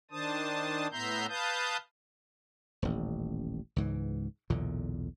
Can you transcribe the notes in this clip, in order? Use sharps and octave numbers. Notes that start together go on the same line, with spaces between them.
D#3 D4 C5 A5 D#6
A2 B3 E5 A#5 C6 G6
B4 F5 A5 D#6 G6
D#1 A1
C#2 G#2 E3
B1 E2 A#2 D3